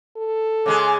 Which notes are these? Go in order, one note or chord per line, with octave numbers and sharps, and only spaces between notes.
A4
C#3 G#3 G#4 D6